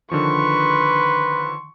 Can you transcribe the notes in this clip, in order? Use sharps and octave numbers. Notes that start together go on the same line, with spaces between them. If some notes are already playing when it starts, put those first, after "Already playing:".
D3 D#3 F3 B4 C6 C#6